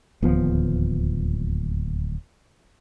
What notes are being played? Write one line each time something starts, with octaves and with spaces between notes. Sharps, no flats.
D1 D#2 F3 B3